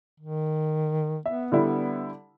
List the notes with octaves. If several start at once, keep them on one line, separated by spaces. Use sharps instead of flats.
D#3
B3 E5
D3 G3 E4